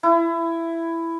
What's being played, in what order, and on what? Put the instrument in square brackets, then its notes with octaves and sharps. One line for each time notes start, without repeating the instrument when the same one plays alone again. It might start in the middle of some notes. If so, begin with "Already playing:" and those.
[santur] E4